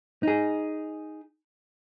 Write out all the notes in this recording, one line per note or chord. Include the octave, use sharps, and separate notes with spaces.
D#4 G#4